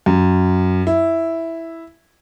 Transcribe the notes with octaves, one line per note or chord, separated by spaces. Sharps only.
F#2
E4